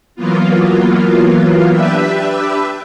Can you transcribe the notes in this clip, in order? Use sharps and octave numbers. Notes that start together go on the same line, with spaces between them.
E3 F#3 A#3 B3 F4
D4 G4 B4 E5